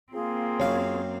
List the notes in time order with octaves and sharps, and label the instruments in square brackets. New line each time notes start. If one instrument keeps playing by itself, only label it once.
[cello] A#3 C4 [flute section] F4 G#4
[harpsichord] F#2 F5 [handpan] C#5